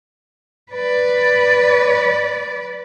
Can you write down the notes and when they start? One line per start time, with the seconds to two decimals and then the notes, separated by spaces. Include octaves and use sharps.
0.71 B4 D5